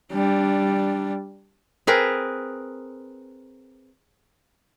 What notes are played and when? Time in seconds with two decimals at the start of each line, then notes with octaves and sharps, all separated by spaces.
0.12 G3 D4
1.87 C4 G#4 A#4 B4